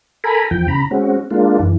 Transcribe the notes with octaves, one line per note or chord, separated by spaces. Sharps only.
A4 A#4 G#5 A#5 B5
E2 F3 G5
C#3 A#5 B5
G#3 C4 C#4 F#4
G#3 A#3 D4 F4
F#2 E3